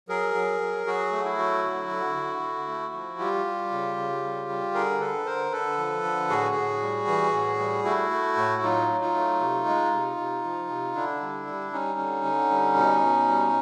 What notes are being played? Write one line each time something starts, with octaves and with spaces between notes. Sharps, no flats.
F#3 G#4 A#4
F#3
F#3
F#3 F#4 G#4
A3
E4 F#4
F#3
D3
D3
D3
D3
A3
F3
G3 F4 G4
G3
C#3
C#3
G3
G3
D3 G#4 A#4
D3 A4 B4
D3 A#4 C5
D3 A4 B4
F3
D3
A2 F#4 G#4
A2
G3
E3
A2
G3
A3 E4 F#4
A3
A2
F#3 D#4 F4
F#3
D#4 F4
A3
C3
G#3
C3
C3
F3
C3
D3 D4 E4
G3
G3
G3 C#4 D#4
D3
D3
G3
B2
B2
G3